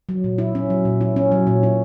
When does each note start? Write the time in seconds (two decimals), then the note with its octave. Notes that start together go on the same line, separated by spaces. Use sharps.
0.09 F#3
0.24 A#2
0.38 E4
0.55 C#4
0.70 F#3
0.85 A#2
1.01 E4
1.16 C#4
1.32 F#3
1.47 A#2
1.63 E4